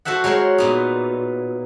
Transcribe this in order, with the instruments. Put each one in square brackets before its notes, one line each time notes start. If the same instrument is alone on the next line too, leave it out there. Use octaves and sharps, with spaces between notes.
[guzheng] F#4 A4 C5 E5 F#5
F#3 G#3 A#4 C5 C#5
A#2 B3 D#4